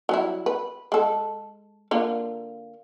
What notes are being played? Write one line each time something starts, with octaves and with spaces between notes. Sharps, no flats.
F#3 G3 E4
B4
G#3 A4
D3 A#3 F4